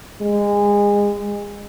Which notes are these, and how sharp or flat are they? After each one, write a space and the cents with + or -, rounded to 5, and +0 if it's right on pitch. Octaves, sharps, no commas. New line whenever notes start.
G#3 -25